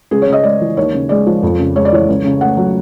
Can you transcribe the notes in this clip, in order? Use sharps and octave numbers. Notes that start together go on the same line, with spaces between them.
C#2 G#4
C#5
C#3
D#5
G#3 D5
E3
D#2 C#5
C#3
G#3 D5
F3
F2
C#3
G#3 C#5
D5
E3 C#5
C#2
C#3
A3 F#5
F#3